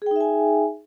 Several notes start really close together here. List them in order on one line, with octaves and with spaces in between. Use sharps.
G#4 G5 D#4 E5 G#5